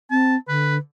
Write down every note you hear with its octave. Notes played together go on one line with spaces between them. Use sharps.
C4 A5
D3 B4